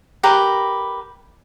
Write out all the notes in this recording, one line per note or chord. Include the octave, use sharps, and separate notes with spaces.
G4 A#4 B4